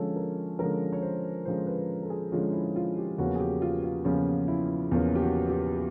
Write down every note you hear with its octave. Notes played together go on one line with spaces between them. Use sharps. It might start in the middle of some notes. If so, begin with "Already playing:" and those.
Already playing: D3 F3 G#3 C#4 A4
A#4
D3 F3 G#3 C#4 A#4
C#5
C5
D3 F3 G#3 C#4 C5
B4
A4
G#4
D3 F3 G#3 C#4 F4
E4
F4
G4
E2 C#3 F3 A#3 C#4 F#4
G#4
G4
F4
F4
E2 C#3 F3 A#3 C#4 F4
E4
E2 C#3 F3 A#3 C#4
G4
F#4
G4